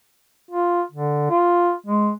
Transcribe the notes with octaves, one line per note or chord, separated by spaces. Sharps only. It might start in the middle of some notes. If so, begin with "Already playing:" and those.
F4
D3
F4
G#3